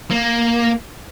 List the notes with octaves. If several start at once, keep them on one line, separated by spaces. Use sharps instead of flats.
A#3